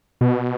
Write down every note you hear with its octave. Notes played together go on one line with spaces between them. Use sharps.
B2